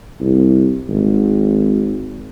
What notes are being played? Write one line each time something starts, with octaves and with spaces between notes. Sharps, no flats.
C2
G#1